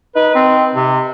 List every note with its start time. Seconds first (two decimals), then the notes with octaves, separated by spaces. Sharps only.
0.15 D#4 B4
0.35 C4
0.75 C3